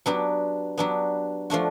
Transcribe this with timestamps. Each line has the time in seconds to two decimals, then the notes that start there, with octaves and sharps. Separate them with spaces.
0.06 F#3 B3 D4 G4
0.78 F#3 B3 D4 G4
1.50 F3 A3 D4 F#4